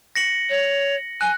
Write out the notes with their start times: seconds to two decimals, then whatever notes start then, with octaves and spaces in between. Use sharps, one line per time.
0.16 A#6 C#7 F#7
0.49 C#5
1.21 G#5 F#6